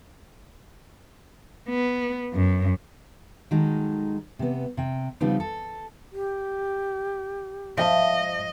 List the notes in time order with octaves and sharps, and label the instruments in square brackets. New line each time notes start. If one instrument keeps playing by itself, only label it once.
[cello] B3
F#2
[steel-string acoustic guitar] D#3 F#3 G#3 D#4 A4
C3 B3
C3 G5
C#3 F3 G3 B3 C4 D#4
A4
[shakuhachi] G4
[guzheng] F3 [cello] D#5 [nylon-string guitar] E5 G5 A5